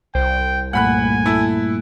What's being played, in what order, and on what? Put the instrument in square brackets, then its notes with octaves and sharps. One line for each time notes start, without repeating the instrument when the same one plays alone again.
[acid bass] C2 [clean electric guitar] C5 [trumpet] G5
[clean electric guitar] G2 A#2 A3 [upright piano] F#5 B5 F#6 [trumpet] G#5
[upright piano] E4 A4